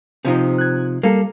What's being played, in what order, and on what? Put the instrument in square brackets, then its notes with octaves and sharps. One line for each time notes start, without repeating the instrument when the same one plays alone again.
[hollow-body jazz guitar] C3 F3 D#4
[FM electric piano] F#6 G#6
[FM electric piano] G3 [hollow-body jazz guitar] A#3 A4